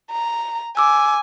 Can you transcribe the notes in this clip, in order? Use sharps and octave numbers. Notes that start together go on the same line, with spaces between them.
A#5
G#5 D6 E6